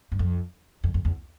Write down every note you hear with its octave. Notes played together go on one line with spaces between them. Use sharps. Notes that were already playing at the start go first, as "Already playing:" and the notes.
G2
F2
F2
F2
E2